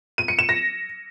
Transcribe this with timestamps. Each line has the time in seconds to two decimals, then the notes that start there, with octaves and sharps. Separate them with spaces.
0.18 D#7
0.28 C#7
0.39 E7
0.49 A#6